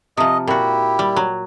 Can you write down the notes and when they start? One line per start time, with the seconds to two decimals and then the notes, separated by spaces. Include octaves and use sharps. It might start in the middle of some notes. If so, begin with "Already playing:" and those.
0.17 C3 F3 D#5
0.47 A#2 E4 F#4 G4
0.99 G3
1.16 F#3